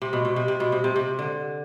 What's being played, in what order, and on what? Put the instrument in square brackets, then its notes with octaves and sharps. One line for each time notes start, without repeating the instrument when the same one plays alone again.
[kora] C3
B2
B2
C3
C3
B2
C3
C3
C3
D3